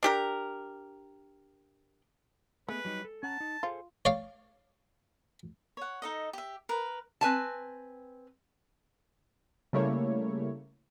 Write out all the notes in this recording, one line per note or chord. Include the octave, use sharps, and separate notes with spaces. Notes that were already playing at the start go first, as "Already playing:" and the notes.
D4 G4 A#4
G#3 A3 B3 B4
F#3 G3 D#4
A4
C#4 F#5 A5 A#5
D#4
F4 G#4 A4 C5
C#5 D5 F5
C#5 F#5
D#4 A4 D#5
G4 E5
A#4 B4
C4 B4 G#5 A5
C#3 G3 A3 A#3 E4 C#5